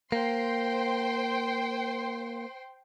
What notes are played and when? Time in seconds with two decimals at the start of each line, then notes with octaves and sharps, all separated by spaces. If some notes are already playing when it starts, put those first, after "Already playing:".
0.12 A#3 C5 G5 C6